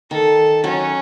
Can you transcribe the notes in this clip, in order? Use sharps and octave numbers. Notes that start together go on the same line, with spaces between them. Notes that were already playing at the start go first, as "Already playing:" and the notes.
D#3 A4
F#3 C#4